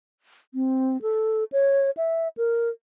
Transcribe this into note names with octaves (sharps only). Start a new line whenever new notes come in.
C4
A4
C#5
E5
A#4